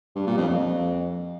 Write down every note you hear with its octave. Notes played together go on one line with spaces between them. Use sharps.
G2
A#2
F2
F2